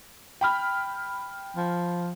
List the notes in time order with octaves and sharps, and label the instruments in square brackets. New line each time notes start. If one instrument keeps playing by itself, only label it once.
[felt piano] G5 B5 F6
[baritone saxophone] F3